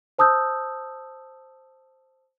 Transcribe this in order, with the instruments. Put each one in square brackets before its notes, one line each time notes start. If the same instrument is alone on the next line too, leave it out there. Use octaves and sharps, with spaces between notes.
[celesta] C5 A5 D#6 E6 G6